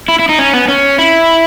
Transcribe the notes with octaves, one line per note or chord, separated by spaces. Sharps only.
E4
E4
D#4
C#4
B3
C#4
E4